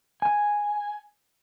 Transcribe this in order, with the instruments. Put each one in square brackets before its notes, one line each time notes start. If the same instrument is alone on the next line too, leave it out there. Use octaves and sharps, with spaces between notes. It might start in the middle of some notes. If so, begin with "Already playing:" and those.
[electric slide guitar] G#5